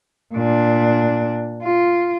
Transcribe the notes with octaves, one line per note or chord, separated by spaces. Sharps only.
A#2 D4
F4